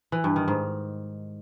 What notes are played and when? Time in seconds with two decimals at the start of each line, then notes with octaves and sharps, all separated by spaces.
0.12 E3
0.24 G2
0.36 D#3
0.48 G#2